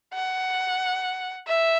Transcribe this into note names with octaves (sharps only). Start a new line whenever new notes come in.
F#5
E5